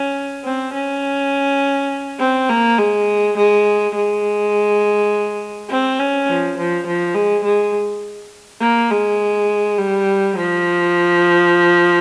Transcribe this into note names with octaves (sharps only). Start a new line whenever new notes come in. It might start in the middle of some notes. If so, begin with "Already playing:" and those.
Already playing: C#4
C4
C#4
C4
A#3
G#3
G#3
G#3
C4
C#4
F3
F3
F3
G#3
G#3
A#3
G#3
G3
F3